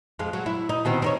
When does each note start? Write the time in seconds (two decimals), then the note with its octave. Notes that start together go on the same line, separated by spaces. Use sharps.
0.19 F2 G#3 F4
0.33 F#3
0.46 E4
0.69 D#4
0.85 B2 D#3 C4
1.02 C4 D#4 C#5